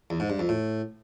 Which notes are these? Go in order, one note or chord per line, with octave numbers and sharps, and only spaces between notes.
E2
G#2
G2
F2
A2